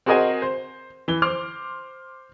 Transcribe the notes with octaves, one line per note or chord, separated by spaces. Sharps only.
C4 F#4 G#4 A#4 D#5 G#5
C5
E3 G7
C5 C6 D6 F6